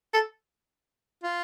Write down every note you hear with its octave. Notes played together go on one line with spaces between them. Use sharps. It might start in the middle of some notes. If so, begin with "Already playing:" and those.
A4
F4